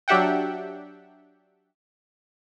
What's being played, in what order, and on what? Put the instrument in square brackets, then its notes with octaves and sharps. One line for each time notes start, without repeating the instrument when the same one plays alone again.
[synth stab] F#3 D4 G4 E5 F#5 G5